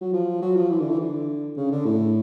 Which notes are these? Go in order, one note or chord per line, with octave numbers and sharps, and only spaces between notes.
F#3
F3
F#3
F3
E3
D3
E3
D3
C#3
D3
A2